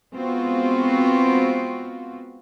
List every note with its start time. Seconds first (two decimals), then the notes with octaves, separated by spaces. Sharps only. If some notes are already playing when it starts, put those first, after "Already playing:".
0.13 G#3 B3 C4 F4 F#4